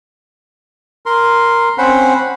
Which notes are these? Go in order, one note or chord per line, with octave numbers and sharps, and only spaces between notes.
A#4 C6
C4 C#4 C5 F#5 B5